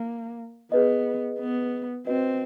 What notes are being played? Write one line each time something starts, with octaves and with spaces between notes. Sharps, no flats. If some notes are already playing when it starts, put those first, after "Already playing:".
Already playing: A#3
B3 G#4 B4 D#5
B3
C4 F#4 B4 D#5